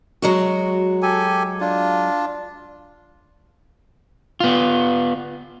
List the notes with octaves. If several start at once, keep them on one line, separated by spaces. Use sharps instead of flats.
F#3 G#3 F#4
G4 A4 G#5
D4 F4
B3 F4